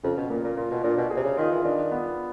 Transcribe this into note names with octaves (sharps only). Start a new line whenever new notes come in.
F2 C#3
B2
A#2 A#3
A#2
A#2 F4
B2
A#2 D4
B2
G#4
C3
C#3
D#3 F4
E3
D#3 D4
B3